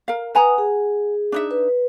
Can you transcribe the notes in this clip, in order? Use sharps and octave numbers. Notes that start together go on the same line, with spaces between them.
A#4 F5
B4 F#5 G#5 A#5 D#6
G#4
D4 D#4 E5
B4